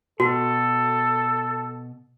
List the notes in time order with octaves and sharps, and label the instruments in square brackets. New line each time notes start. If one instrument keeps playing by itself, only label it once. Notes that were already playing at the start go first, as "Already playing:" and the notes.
[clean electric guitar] B2 [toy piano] F#4 [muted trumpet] A4